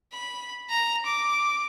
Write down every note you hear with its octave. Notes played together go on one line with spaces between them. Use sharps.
B5
A#5
D6